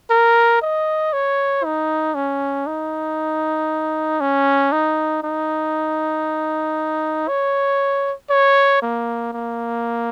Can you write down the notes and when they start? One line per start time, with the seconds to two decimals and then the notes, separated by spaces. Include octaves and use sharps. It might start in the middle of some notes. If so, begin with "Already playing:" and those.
0.11 A#4
0.62 D#5
1.13 C#5
1.65 D#4
2.15 C#4
2.67 D#4
4.20 C#4
4.72 D#4
5.23 D#4
7.28 C#5
8.30 C#5
8.82 A#3
9.33 A#3